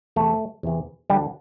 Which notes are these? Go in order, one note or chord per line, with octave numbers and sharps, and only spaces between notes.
E2 C3 E3 A3
E2 C3 E3
D2 D3 G3